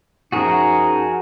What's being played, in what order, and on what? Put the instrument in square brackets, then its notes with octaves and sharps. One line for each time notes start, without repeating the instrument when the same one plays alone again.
[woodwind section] F#2 F3 D#4 [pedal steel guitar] F#4 G#4 A#4